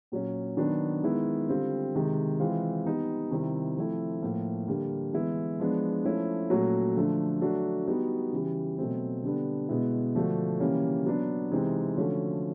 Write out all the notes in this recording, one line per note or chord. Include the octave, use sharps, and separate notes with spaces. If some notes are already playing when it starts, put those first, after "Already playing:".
A#2 F#3 A#3 C#4
D#3 F#3 B3 D4
D#3 G#3 B3 E4
D3 G3 C4 F4
C3 D#3 G#3
E3 G#3 C4 F4
G3 B3 D#4
C3 D#3 G3 C4 E4
F3 A3 C4 E4
A2 F3 A#3
D3 G3 A#3
E3 G#3 B3 E4
F3 G#3 B3 D4
F3 A3 C#4 E4
A#2 F#3 A3 C#4 F#4
D3 F3 A3 D4
F#3 A3 D4 F#4
G3 B3 D#4 F#4
C#3 E3 G3
B2 F#3 A3 C4
D3 G3 B3 D4
B2 G#3 B3 E4
D3 F3 A3 D4 F#4
C#3 E3 G3 A#3 C#4
F#3 B3 D4
C3 E3 G#3 C4 D#4
D3 F3 A3 C#4 F#4